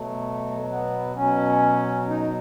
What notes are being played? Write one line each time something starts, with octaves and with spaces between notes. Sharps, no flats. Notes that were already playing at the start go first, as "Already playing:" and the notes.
Already playing: B2 F#3 A3
B3
B2 F#3 C#4
D#4